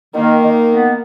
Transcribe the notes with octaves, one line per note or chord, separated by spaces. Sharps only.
D#3 A#3
D#3
B3